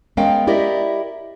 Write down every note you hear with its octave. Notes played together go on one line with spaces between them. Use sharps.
G#3 B3 C#4 A#4 F5 G5
E4 G4 A#4 D5 D#5